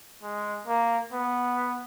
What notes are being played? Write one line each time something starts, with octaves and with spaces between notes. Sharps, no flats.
G#3
A#3
B3